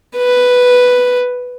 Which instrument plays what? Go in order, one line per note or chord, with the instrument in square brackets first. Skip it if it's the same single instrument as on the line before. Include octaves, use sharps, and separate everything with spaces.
[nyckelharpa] B4